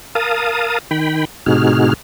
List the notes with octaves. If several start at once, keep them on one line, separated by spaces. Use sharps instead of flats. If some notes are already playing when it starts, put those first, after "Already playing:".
A#4 F5 A5 D#6
D#3 G5 B5
A2 C3 D#4 F#4 G#4 F6